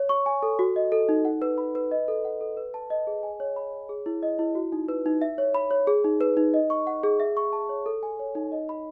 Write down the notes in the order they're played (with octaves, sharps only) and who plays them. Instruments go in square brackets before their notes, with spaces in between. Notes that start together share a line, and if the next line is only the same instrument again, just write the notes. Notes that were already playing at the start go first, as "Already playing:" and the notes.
Already playing: [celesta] C#5
C#6
G#5
A4
F#4
D#5
A4
D#4
F#5
B4
B5
B4
D#5
A4
F#5
A4
B4
A5
D#5
G#4
G#5
C#5
B5
C#5
G#4
E4
D#5
E4
F#4
D#4
B4
D#4
E5
C#5
B5
C#5
G#4
D#4
B4
D#4
D#5
C#6
F#5
G#4
E5
C#6
A5
C#5
A4
G#5
C#5
D#4
D#5
B5